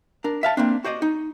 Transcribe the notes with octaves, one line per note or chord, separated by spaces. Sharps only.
D4 A#4
E5 F5 A5
A#3 C4 D4
F#4 C5 D5 D#5
D#4